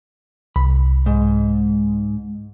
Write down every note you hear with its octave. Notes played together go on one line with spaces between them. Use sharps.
C2 B5
G#2